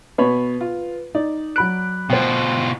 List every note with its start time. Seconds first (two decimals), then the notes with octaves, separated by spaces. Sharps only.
0.18 B2 B4 C#5 B5
0.61 F4
1.15 D#4 D5
1.56 F#3 B5 F#6 D7
2.10 B2 F4 C5 G5